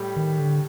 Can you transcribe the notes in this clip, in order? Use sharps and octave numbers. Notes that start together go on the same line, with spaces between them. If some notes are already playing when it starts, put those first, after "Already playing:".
Already playing: A2 G3
D#3
D3